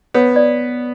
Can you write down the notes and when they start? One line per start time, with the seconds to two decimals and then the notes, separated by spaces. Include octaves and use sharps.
0.14 B3 C#5
0.36 D5